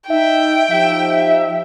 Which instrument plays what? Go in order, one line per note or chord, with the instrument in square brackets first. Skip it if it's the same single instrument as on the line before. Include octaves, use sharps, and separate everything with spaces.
[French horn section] D#4 [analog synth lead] E5 [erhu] G5
[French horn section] F3 D#4 G4 [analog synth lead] E5